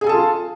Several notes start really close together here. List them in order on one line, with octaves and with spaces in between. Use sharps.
G#4 G#5 A4 A5 F4